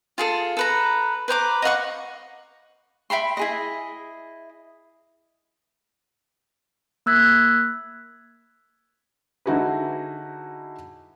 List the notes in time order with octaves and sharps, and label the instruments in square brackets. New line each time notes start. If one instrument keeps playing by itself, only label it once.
[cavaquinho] F4 G#4 A4
A4 B4 A#5
B4 C5 A#5 D6
D#5 F5 F#5 C#6
E5 G5 B5 C6
E4 G#4 D#5
[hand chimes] A#3 E6 F#6 G#6 B6
[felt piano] D3 D#4 E4 F#4 G#4 B4